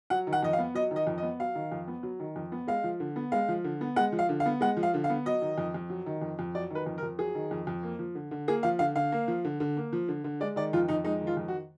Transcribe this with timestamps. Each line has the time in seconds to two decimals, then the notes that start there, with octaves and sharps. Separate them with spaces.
0.10 F#3 F#5
0.27 D#3
0.33 F#5
0.43 F2 D#5
0.53 F5
0.58 B3
0.74 F#3 D#5
0.91 D#3
0.96 D#5
1.07 F2
1.18 D#5
1.23 B3
1.40 F#3 F5
1.55 D#3
1.72 F2
1.88 B3
2.03 F#3
2.20 D#3
2.36 F2
2.52 B3
2.67 G#3 F5
2.84 F3
3.00 D3
3.16 B3
3.32 G#3 F5
3.48 F3
3.64 D3
3.81 B3
3.96 G#3 F#5
4.12 F3
4.19 F5
4.29 D3
4.40 F5
4.46 B3
4.61 G#3 F#5
4.77 F3
4.83 F5
4.94 D3
5.04 F5
5.10 B3
5.26 F#3 D#5
5.42 D#3
5.58 F2
5.74 F2
5.90 F#3
6.06 D#3
6.22 F2
6.39 F2
6.55 F#3 D5
6.70 D#3 B4
6.86 F2
6.98 A#4
7.03 F2
7.19 F#3 G#4
7.35 D#3
7.51 F2
7.67 F2
7.83 A#3
7.99 F3
8.15 D3
8.31 D3
8.48 A#3 G#4
8.63 F3 F5
8.79 D3 F5
8.96 D3 F5
9.12 A#3
9.28 F3
9.45 D3
9.60 D3
9.77 A#3
9.93 F3
10.08 D3
10.24 D3
10.40 G#3 D5
10.56 D#3 D5
10.73 F2 F4
10.89 F2 D#4
11.04 G#3 D#4
11.21 D#3
11.27 F4
11.37 F2
11.48 F#4